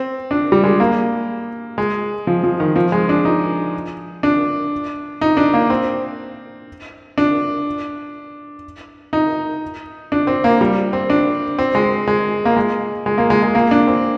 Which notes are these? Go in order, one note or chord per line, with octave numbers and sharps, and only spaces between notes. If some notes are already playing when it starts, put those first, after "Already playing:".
Already playing: C4
D4
G3
G#3
A#3
G#3
F3
F3
D#3
F3
G#3
D4
D#4
D4
D#4
D4
A#3
C4
D4
D#4
D4
C4
A#3
G3
C4
D4
C4
G#3
G#3
A#3
G#3
G#3
A#3
G#3
G#3
A#3
D4
C4